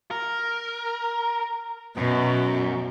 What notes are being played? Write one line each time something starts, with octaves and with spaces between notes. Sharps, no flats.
A#4
F#2 B2